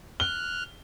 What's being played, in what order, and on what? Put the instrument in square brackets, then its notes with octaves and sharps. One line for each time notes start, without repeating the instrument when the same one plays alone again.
[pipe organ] F6 F#6 [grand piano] G7